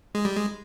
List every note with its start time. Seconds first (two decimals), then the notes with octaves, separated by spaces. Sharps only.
0.15 G#3
0.25 G3
0.36 G#3